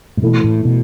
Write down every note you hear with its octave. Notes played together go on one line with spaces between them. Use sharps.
A2
B2 E3 A3 E4
A2
B2